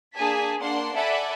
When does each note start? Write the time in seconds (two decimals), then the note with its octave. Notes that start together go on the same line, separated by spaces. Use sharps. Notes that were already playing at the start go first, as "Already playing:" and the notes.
0.16 A#3 D4 G#4 G#5 A5 B6
0.59 A#3 D4 F#5 C6 C7
0.95 A4 D5 E5 F#5 G#5 B5